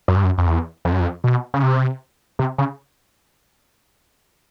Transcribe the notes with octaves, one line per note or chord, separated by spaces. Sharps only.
F#2
G2
F#2
F2
E2
F2
F#2
F2
B2
C#3
C3
C3
C#3